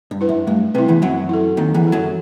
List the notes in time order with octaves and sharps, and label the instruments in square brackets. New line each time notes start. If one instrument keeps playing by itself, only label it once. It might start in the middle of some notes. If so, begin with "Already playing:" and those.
[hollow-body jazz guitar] G2
[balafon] E4 B4
[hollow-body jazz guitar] F#2
[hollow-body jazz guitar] G2 [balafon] A3
[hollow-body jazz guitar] C2 C3 [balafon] E4 B4
[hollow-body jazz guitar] E2 E3
[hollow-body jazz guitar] F#2 F#3 [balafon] C4
[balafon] E4 A4
[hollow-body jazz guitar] D#2 D#3 [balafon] C4
[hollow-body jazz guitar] E2 E3
[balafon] E4 A4
[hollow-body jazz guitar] F#2 F#3